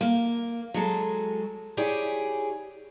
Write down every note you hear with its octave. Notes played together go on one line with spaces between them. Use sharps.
A#3
F#3 G#3 A4
E4 G4 G#4 C#5 D5